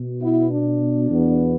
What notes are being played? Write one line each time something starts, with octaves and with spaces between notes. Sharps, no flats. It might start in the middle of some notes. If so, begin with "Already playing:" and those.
Already playing: B2
B3 E4
D4
E2 B2 B3